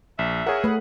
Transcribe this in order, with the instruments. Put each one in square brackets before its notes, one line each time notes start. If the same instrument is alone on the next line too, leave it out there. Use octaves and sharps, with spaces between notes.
[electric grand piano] A#1 [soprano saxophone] E5
[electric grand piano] G#4 F#5 [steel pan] A#4 C#5
[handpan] A3 [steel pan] B4